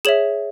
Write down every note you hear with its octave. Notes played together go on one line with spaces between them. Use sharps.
G#4 C#5 E5 E7 F#7